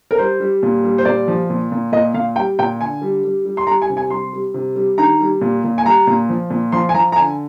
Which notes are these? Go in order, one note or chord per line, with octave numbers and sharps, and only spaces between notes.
A#4
G3 C5
G3
A#2
G3
C5
A#2 D5
F3
A#2
A#2
A#2 D#5
A#2 F5
G3 G5
A#2 G5
D3 G#5
G3
G3
G3
C6
G3 A#5
G#5
C3
G#5
G3 C6
G3
C3
G3
D#3 A#5
G3
A#2
A#2
G#5
G3 A#5
A#2
F3
A#2
F3 C6
G#5
F3 A#5
A#5
D3 G#5